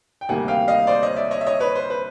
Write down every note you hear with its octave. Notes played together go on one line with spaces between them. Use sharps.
G5
D2 C3 D#3 G3 A#3 F#5 G#5
F5 G5
D#5 F5
C5 D5
C#5 D#5
D5 E5
C#5 D#5
E5
C#5 D#5
B4 C#5
C5
B4